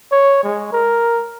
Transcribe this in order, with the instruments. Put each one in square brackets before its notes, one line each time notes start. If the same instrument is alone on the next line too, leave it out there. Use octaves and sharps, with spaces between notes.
[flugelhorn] C#5
G#3
A#4